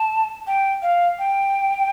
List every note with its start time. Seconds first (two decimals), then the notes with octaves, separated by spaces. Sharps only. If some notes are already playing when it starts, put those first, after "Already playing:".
Already playing: A5
0.47 G5
0.82 F5
1.19 G5